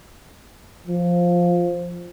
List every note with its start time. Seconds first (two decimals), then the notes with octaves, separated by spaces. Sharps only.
0.87 F3